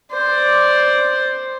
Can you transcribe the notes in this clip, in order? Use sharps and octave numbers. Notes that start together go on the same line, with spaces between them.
C5 D5